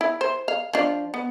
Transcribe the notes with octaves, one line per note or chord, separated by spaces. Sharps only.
E4
C5
F5
F3 D4
B3